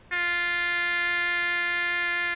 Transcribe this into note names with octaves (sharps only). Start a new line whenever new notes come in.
F4